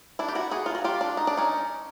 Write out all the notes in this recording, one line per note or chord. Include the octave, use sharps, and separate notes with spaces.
D4 E4
G4
E4 F#4
F#4 G#4
F4
F#4
F4 G4
D4
D#4
D4
C#4 D#4